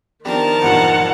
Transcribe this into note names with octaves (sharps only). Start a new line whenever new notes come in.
D#3 F3 B3 D4 G4 A#4 A5
E2 G2 A#2 F#5